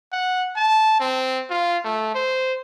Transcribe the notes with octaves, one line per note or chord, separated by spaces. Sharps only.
F#5
A5
C4
F4
A3
C5